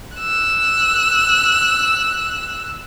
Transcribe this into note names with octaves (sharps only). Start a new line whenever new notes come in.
E6 F#6